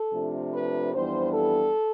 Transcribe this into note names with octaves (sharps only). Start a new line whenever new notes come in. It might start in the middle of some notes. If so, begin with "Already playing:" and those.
Already playing: A4
C3 F3 A3 D4
B4
F2 E3 G3 B3 D4 C5
A4